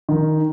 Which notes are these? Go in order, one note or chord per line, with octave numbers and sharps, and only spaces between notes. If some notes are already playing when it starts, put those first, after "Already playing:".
D#3